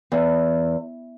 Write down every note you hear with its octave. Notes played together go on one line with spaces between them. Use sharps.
E2